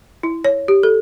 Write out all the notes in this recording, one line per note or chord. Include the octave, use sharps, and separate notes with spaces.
E4
C#5
G4
A4